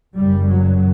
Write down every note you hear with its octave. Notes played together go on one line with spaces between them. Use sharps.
F#1 F#2 C#3 G3
F#3